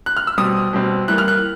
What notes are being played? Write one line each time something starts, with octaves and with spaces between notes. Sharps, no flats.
F#6
F6
E6
B2 G3 C4 D#6
B2 G3 C4
E3 G3 A#3 F#6
F6
F#6